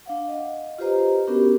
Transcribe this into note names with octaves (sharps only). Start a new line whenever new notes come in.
D4 F5 F#5
D#5
F4 G4 B4 C5 D#5 A#5
B3 C#4 D4 F#4 G4 A#4